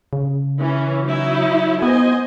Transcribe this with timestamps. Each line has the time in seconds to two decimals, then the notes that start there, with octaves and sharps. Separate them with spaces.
0.13 C#3
0.60 E3 C#4
1.06 F#3 D#4 E4
1.82 B3 C5 D#5 G#5